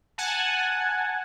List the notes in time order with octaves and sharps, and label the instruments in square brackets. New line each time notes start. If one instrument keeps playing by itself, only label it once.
[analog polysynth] F#5 G#5 A5